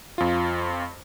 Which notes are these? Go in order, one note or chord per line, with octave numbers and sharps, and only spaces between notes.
F2 F4